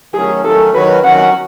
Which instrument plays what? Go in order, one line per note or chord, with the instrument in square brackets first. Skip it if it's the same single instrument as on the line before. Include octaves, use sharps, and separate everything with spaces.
[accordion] D#3 F#3 A3 C#4 [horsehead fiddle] G#4
[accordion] D#3 F#3 A3 C#4 [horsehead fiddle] A4
[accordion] D#3 F#3 C#4 F#4 [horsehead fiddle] B4
[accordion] D#3 F#3 C#4 F#4 [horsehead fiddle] F#5